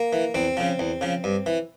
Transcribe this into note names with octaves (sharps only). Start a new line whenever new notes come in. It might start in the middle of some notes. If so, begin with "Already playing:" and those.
Already playing: A#3
E3
E2 C4
C#3 F3
E2
C#3 F3
G2
E3